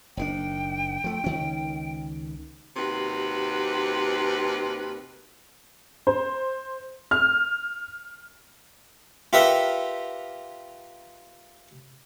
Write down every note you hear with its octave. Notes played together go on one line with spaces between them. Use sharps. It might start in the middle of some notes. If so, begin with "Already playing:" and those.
F#1 D#3 D4 G5
F3 A3
C#2 D#3 C#4
D#2 C3 F#4 B4
C5
F6
F4 G4 A#4 B4 E5 F#5